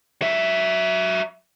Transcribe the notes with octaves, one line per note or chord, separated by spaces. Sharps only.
F#3 E5